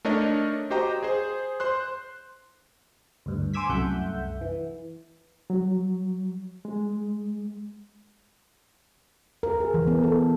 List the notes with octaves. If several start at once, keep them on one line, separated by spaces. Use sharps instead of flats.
A3 D4 D#4 A#4 C#5 D#5
F#4 G4 C5 D#5 G5 A#5
G#4 C5
C5 C6 F#6
D2 G2
C5 G#5 D6 E6 G#6 B6
C2 F#2 A3 E5 F#5 G6
E3
F#3
G#3
A#4
G#4
E3
B3
A4